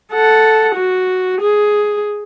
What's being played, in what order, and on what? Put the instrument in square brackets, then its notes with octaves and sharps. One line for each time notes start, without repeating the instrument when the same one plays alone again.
[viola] A4 F#5
F#4
G#4